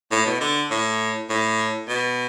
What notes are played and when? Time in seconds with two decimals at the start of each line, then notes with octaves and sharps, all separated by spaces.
0.11 A2
0.26 B2
0.40 D3
0.71 A2
1.29 A2
1.88 B2